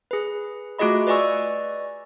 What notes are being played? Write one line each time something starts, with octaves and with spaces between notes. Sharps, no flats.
G#4 B4
A3 F4 F#4 G#4 D#5 B5
B4 D5 D#5 G#5 C#6 E6